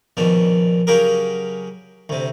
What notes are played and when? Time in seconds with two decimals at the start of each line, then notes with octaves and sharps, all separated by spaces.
0.17 A#1 B2 D#3 D4
0.87 C#3 F#3 G4 G#4 A#4
2.09 D2 C3